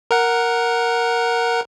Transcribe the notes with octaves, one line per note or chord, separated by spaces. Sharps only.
A#4 F#5